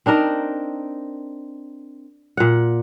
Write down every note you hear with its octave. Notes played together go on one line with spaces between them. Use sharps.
C4 D4 D#4 A#4
A#2 F#5